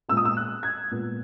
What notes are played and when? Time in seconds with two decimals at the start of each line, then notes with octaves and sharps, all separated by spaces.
0.09 A#2 G#3 B3 E6
0.17 D#6
0.25 E6
0.37 F#6
0.63 G#6
0.91 A#2 G#3 B3